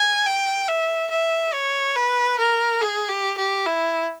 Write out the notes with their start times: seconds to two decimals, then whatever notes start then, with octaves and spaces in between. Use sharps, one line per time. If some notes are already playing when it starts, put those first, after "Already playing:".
Already playing: G#5
0.26 G5
0.68 E5
1.11 E5
1.53 C#5
1.96 B4
2.39 A#4
2.81 G#4
3.09 G4
3.38 G4
3.66 E4